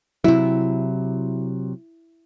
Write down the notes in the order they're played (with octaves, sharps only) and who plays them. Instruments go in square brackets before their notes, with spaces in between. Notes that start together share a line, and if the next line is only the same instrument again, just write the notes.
[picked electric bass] C3 F#3 [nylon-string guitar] E4